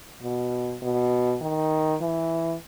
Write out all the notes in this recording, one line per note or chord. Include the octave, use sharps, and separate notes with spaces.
B2
B2
D#3
E3